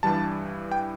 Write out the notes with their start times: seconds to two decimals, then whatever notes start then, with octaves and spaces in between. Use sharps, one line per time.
0.03 G2 E3 G3 A5
0.72 G5